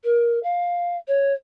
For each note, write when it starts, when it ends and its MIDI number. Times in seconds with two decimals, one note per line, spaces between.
0.04 0.39 70
0.43 0.96 77
1.08 1.33 73